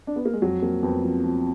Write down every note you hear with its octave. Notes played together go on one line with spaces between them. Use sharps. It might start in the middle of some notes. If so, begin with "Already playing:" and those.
D4
B3
A#3
G#3
F2 F#3
F2 A#3
F2 B3
F3
F3